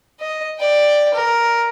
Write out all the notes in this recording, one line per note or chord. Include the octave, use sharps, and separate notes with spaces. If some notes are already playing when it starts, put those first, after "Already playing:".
D#5
D5 G5
A#4